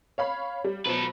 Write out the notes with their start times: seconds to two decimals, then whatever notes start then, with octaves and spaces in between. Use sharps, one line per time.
0.18 C#5 F5 B5
0.64 G3
0.85 B2 F3 F#3 A4 B4